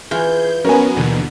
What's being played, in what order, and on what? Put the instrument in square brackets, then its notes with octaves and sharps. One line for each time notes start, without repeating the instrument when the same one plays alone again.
[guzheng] E3 F4 [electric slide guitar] G#4 [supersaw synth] G6
[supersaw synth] F#3 B3 [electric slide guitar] C#4 [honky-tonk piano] A#4 G#5
[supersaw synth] D#2 B2 D3 [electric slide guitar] E3